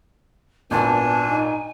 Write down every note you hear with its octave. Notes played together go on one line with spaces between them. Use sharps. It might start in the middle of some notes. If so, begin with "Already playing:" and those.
G#1 A#2 B3 D4 G#5 A5
D#4